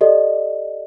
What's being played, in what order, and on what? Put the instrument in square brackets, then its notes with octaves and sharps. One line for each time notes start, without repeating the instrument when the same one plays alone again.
[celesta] G4 A4 D5 D#5